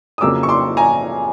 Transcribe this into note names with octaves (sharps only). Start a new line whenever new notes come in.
D#6
F2 C#3 F#3 A#3 D6 E6
C#6
C6 D6
G#5 A#5